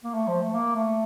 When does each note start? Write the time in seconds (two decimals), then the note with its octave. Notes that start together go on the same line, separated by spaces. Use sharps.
0.04 A#3
0.14 A3
0.28 F3
0.41 A3
0.55 A#3
0.75 A3